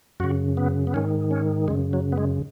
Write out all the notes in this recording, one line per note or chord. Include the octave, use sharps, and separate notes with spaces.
F#2 C#3 F#4
B3
B3
G#2 D#3 C#4
C#4
F#2 C#3 G#3
F#3
B3
G#3